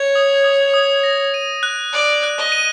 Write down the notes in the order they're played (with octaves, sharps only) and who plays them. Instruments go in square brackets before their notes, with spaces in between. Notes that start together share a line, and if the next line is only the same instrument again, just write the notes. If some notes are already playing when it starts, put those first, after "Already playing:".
Already playing: [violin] C#5 [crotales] G#6
[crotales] D#6
D#6
D#6
A#6
D#7
F#6
[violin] D5 [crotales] F#6
[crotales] F#6
[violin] D#5
[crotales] D#7